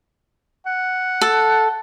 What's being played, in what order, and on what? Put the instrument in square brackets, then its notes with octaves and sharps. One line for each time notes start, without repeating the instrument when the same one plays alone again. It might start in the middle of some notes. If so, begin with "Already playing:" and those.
[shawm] F#5
[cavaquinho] A4